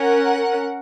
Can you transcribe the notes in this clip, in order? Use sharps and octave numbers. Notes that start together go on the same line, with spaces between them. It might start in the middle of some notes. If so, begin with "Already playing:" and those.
Already playing: C#4 A#4 F#5